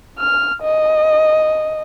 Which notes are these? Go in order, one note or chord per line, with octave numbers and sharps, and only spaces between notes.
F6
D#5